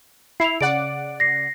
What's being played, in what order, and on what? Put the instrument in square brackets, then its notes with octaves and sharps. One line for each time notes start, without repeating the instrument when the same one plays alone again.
[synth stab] E4 [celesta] C7 F7
[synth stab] C#3 D5 F#5 [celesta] D7
[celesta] A#6 C7